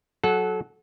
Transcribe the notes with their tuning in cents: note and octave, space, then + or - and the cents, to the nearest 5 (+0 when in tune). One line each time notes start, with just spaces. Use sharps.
F#3 +0 A4 -25 F#5 +0